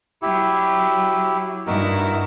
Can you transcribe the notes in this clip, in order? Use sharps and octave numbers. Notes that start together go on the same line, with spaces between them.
F#3 E4 G4
G2 D#4 E4 F#4 A#4